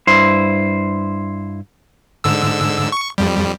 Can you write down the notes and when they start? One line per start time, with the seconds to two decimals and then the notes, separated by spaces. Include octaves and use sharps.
0.07 G2 E4 C5
2.24 G#2 D3 E6
2.92 C#6
3.18 F2 G3